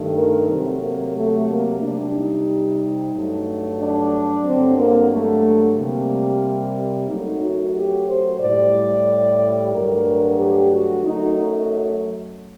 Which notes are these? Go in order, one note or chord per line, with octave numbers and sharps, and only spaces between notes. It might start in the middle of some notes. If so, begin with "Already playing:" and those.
Already playing: G2 D#3 A3
A#4
C3 F#3 A3 C4
A#3
A3
A#3
C3 G3 D4
D#4
G2 F#3 A3
D4
G2 D3 F#3 C4
A#3
A3
C3 G3 A#3
F#2 F#3 A3 D#4
F#4
G4
C5
A2 G3 D5
G2 D3 F#3 A3 A#4
G4
F#4
F#2 F#3 A3 D#4